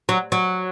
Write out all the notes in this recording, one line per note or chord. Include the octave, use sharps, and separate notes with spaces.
F#3
F#3